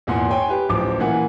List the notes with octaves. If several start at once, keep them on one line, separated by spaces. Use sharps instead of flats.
G#1 E2 A#2 F#5 G#5 C6
C#5 G5 G#5 C6
G4 B4
D1 A1 F3 D6
A#2 E3 A#3 F#5 G#5